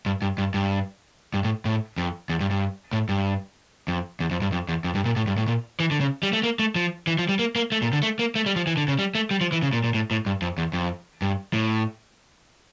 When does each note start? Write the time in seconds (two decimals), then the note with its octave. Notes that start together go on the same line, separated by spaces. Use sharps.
0.06 G2
0.22 G2
0.38 G2
0.54 G2
1.34 G2
1.44 A2
1.65 A2
1.98 F2
2.29 E2
2.40 G2
2.51 G2
2.93 A2
3.09 G2
3.88 F2
4.20 E2
4.31 F2
4.42 G2
4.52 F2
4.68 E2
4.84 F2
4.95 G2
5.06 A#2
5.16 A2
5.27 G2
5.37 A2
5.48 A#2
5.80 E3
5.91 D3
6.01 C#3
6.23 G3
6.33 A3
6.43 A#3
6.59 A3
6.75 F3
7.07 E3
7.18 F3
7.29 G3
7.39 A#3
7.56 A#3
7.72 A3
7.82 A#2
7.93 D3
8.03 A3
8.19 A#3
8.35 A3
8.46 G3
8.56 F3
8.67 E3
8.77 D3
8.88 C#3
8.99 G3
9.15 A3
9.31 G3
9.41 F3
9.52 E3
9.62 C#3
9.73 A#2
9.84 A#2
9.94 A2
10.11 A2
10.26 G2
10.42 F2
10.58 E2
10.73 F2
11.22 G2
11.53 A2